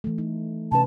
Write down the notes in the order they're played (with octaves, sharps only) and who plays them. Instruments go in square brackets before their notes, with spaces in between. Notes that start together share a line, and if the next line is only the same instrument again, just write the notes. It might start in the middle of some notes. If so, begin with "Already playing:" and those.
[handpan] E3 A3
D#4
[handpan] C3 C#4 B4 [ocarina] A5